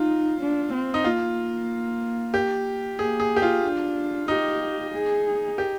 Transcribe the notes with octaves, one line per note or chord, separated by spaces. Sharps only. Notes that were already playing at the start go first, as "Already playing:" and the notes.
Already playing: D#4 F4
D4
C4
D#4
A#3 F4
G4
A#3 G#4
G#4
G4
F4
D4
D#4 G4
G#4
G4